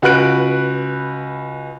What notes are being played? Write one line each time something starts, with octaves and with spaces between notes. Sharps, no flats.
C#2 F#4 B4 F#6 D7